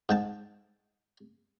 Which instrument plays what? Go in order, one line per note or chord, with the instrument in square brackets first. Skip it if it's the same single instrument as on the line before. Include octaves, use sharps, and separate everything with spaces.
[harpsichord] G#2 G5 A5